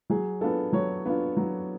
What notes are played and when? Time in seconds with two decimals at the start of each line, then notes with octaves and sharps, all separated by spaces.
0.10 F#3 G#4
0.41 B3 D4 F4 A4
0.73 F#3 C#5
1.05 B3 D4 F4
1.37 F#3